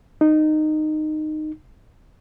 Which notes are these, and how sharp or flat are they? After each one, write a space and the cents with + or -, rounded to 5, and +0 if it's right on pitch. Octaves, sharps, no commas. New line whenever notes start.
D#4 -15